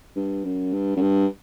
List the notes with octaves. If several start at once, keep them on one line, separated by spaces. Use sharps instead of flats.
G2
F#2
G2
F#2
G2